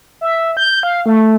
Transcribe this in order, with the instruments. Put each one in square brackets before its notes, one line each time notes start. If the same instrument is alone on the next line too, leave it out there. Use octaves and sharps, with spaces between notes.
[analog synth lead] E5
G6
F5
A3